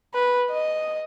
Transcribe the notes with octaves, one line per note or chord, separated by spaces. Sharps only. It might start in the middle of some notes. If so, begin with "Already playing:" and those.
B4
D#5